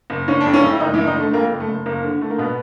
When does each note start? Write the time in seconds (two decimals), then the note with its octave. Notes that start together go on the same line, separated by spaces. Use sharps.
0.10 F#1
0.28 F#1 C#4
0.40 D4
0.46 F2
0.54 C#3 C#4
0.64 F2
0.70 E4
0.80 F#1 D#3 D#4
0.93 E3 E4
0.98 F#1
1.07 D#3 D#4
1.16 D3 A3
1.33 F2 A#3
1.52 F#1
1.60 A3
1.68 F#1
1.86 F#1 A#3
2.03 D3
2.21 D3 A3
2.30 A#3
2.38 B2 B3